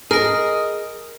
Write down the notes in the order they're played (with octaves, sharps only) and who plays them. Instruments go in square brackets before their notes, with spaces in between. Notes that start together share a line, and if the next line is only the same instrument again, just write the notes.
[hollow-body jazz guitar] G#4 [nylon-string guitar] A#4 [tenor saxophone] D#5 [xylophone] F6 A#6